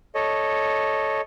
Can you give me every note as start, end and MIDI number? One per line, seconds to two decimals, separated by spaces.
0.15 1.21 69
0.15 1.21 73
0.15 1.21 75